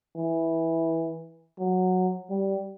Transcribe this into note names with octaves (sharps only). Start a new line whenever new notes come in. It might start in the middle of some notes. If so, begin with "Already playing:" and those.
E3
F#3
G3